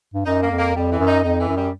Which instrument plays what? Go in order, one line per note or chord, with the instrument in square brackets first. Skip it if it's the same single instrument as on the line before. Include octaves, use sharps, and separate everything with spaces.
[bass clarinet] G2
[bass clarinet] F#2 [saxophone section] D#4
[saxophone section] A#3
[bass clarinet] F2
[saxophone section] A#3
[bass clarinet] F2 [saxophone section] G3
[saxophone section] E3
[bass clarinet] F#2
[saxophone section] D#4
[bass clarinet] F2 [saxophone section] D#4
[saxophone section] E3
[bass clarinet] F#2
[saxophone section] G3